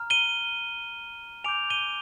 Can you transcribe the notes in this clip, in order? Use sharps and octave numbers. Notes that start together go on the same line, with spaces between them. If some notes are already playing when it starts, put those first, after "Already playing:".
Already playing: A#5 F6
D#7 G7
G#5 D6 G6 D7 F7
D#7 G7